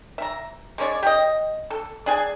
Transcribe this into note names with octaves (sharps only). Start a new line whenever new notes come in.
E5 A#5
G#3 C#4 C#5 D5
G4 D#5
A4
D4 G#4 G#5